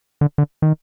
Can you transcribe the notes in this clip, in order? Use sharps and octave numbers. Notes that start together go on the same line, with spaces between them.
D3
D3
D#3